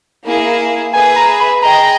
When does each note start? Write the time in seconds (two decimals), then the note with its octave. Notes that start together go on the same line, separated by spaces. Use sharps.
0.25 A#3 E4 G#4
0.93 G#4 B4 E5 G#5
1.16 A#5
1.40 B5
1.63 G#4 D#5 G5 A#5